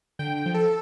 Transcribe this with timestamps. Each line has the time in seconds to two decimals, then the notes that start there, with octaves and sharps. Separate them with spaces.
0.19 D3 G5
0.37 G5
0.46 F3
0.54 A4